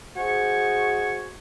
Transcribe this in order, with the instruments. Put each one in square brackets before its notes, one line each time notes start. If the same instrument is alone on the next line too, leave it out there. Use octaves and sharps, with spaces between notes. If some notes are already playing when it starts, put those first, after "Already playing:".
[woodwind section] F#4 G#4 C5 D#5 G#5 C#6